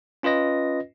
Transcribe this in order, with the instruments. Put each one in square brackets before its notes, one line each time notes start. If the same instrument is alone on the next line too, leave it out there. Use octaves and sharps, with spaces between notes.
[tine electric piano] C#4 F4 B4 D#5 A#6